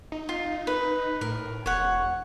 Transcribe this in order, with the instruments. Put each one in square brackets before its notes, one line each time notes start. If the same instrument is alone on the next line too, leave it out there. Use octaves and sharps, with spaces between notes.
[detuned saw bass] D#4
[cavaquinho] F4
B4
[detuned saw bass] A2 [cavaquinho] A#4
[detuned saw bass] E1 [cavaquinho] C#5 F#5